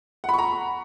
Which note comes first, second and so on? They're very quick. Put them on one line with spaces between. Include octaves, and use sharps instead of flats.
F#5 B5 C#6 A#5